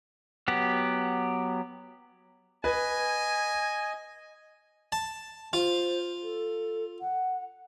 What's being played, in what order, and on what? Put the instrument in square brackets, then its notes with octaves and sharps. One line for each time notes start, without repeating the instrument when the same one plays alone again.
[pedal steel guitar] F#3 B3 G4
[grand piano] B4 [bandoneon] D#5 [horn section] G#5
[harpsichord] A5
[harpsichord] F4 [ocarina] C5
[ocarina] A4
F#5